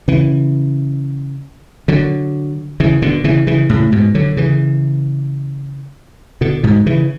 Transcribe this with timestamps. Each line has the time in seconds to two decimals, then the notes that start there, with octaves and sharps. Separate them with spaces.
0.08 C#3 E3
1.88 D3 F#3
2.80 C#3 E3
3.02 B2 D3
3.24 C#3 E3
3.47 C#3 E3
3.69 A2 C#3
3.92 G#2 B2
4.15 D3 F#3
4.37 C#3 E3
6.41 B2 D3
6.63 G#2 B2
6.86 C#3 E3